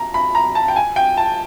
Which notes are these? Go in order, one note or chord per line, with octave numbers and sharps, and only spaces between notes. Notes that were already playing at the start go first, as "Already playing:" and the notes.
Already playing: A#5
B5
A#5
A5
G5
G#5
G5
A5